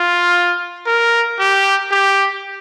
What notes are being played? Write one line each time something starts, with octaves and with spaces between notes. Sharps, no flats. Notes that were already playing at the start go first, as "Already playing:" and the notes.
Already playing: F4
A#4
G4
G4